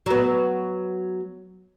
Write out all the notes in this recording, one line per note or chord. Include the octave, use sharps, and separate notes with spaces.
F#3 B3